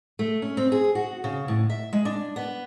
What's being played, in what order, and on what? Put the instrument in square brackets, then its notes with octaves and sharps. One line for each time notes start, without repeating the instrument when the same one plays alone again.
[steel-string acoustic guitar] A3
C#4
C4
G#4
F#4
C#3
A2
E5
G#3
D4
B3